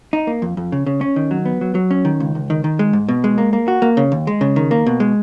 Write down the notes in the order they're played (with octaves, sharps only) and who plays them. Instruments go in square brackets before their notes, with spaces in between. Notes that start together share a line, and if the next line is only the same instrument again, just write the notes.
[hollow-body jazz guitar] D#4
A#3
F2
F2
C#3
C#3
C#4
D#3
F#3
B3
F#3
F#3
C#4
D#3
C#2
C#2
D#3
D#3
G#3
G#2
B2
G#3
A#3
A#3
F#4
A#3
C#3
D#2
G#3
C#3
D#3
A#3
B2
G#3